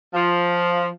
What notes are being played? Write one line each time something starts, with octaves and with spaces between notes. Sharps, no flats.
F3